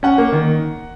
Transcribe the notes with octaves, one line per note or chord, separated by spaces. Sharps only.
C#4 F#5
A#3
D#3